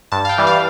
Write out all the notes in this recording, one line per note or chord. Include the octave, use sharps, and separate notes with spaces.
G2 A5
F5
G5
E3 G3
F5